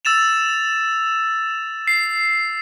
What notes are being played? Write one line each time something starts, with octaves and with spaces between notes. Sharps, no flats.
E6 A6 E7 F7
C7